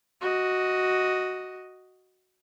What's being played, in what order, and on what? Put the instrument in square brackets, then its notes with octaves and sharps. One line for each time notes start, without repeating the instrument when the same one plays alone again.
[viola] F#4 D#5